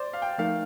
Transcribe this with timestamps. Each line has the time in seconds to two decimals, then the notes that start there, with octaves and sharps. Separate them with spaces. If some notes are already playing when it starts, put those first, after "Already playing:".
Already playing: C5 D5
0.13 F5
0.22 G5
0.38 F3 A3 D#4 A#4 F5